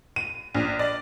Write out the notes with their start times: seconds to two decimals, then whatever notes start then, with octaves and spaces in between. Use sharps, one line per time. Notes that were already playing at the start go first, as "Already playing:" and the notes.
0.16 D#7
0.55 A#1
0.79 D5